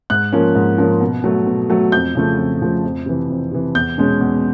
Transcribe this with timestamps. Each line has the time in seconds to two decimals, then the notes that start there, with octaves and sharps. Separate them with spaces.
0.10 G#2 F#6
0.32 F3 A#3 C#4
0.55 G#2
0.78 F3 A#3 C#4
1.01 B2
1.24 F#3 A3
1.47 B2
1.70 F#3 A3
1.92 F2 G6
2.15 C#3 F3 A3
2.38 F2
2.61 C#3 F3 A3
2.84 F2
3.06 C3 E3
3.29 F2
3.52 C3 E3
3.75 E2 G6
3.98 B2 G#3 C#4
4.20 E2